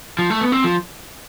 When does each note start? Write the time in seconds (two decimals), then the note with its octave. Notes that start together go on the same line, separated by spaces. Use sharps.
0.19 F3
0.30 A3
0.41 B3
0.52 C4
0.64 F3